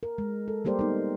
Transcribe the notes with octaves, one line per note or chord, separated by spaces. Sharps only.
A#4
G#3
A4
G3 A#3 G4 A#4 C5 D5
B3 D#4